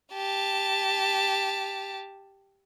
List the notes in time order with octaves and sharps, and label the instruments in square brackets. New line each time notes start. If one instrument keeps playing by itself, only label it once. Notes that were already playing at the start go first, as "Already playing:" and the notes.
[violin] G4 A5